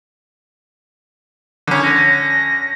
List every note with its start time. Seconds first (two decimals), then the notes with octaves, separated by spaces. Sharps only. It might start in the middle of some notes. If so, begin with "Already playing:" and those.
1.67 D3 C#4
1.83 A#6